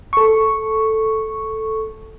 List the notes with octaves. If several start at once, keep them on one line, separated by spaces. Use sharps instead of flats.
A4 C#6